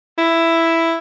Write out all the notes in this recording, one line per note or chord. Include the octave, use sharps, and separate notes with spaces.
E4